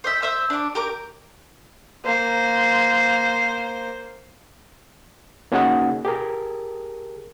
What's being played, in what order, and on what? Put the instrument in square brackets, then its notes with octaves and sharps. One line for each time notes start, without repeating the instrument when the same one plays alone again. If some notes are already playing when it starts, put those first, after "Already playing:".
[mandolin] C5 D#5 E5
C5 E5 E6
D4 D6
G4 A#4 D6
[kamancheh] A#3 C5
[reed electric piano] A#3 C#4 D#4 F#4 G#4 F#5
G4 G#4 A#4